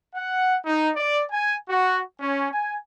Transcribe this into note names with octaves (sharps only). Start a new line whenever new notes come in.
F#5
D#4
D5
G#5
F#4
C#4
G#5